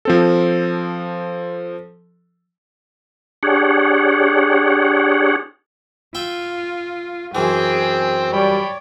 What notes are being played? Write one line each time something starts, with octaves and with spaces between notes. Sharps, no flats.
F3 C4 A4
D4 G4 G#4 C#5 F#5
F4 E5 G5
F#2 E3 C4 G#4 G5
G3 C#5 D5 G5 B5